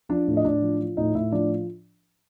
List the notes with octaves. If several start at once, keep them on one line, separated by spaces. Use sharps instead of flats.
F3 D4 D5
A2
D#5
A2 D4 D5
F3
F3
A2 D#4 D#5
A2 E4 E5
F3 D4 D5